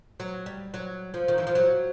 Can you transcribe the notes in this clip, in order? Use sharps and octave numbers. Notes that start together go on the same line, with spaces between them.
F#3
G3
F#3
F3
D#3
E3
F3
F#3